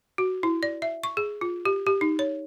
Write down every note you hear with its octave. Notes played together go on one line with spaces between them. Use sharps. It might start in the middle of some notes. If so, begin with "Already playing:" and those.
F#4
E4
D5
E5
C#6
G#4
F4
G4
G4
D#4
C#5